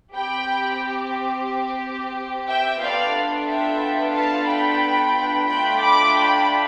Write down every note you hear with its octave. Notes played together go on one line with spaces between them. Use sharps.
C4 G4 G5 B5
E5 G5
B3 D4 F4 A4 D5 F5
E5 G5
F5 A5
G5 B5
A3 D4 F4 G5 B5
B5 D6
G5 B5